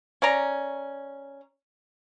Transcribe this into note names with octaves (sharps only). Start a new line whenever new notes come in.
C#4 D5 A#5